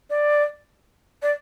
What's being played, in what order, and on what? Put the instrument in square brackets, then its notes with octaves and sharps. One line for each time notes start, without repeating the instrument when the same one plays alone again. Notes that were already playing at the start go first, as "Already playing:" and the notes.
[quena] D5
D5